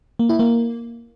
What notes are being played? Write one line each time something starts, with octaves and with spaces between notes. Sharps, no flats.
A#3
E4
A#3